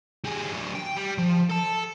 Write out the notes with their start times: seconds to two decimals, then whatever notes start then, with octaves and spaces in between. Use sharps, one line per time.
0.24 G3 G#4
0.52 F#3 D4
0.75 G5
0.96 G3
1.18 F3
1.50 A4 A5